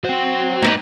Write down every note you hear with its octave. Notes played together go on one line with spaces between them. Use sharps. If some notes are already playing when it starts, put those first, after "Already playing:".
F#3 F#4 C5 G5
G#2 A#3 C4 D#4 B4